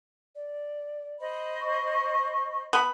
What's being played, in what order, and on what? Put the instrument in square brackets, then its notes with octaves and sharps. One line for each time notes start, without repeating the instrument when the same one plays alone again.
[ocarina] D5
[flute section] C5 D#5 B5
[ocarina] C#6
[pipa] B3 B5